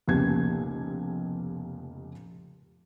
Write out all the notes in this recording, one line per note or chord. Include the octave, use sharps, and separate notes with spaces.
F1 C#2 B2 A#3 G4 G#6